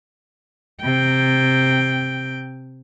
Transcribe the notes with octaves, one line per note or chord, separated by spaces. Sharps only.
C3 G5